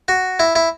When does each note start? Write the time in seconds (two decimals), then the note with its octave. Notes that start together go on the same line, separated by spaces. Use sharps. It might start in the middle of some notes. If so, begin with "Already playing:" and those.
0.08 F#4
0.40 E4
0.55 E4